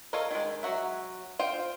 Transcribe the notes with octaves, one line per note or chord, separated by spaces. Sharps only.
F4 A4 A#4 C#5 D#5
D#3 G#3
F#3 F#4 E5
F4 C5 G5